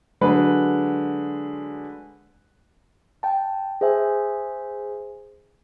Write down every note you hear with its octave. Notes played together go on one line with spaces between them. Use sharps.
D3 F#3 G#3 B4
G5 A5
G#4 C5 E5 G#5